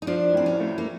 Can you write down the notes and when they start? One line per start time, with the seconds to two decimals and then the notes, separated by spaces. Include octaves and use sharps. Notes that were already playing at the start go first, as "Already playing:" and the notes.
0.02 D#4
0.07 F3 D4
0.34 A2 C4
0.46 C#4
0.60 A3
0.78 A#3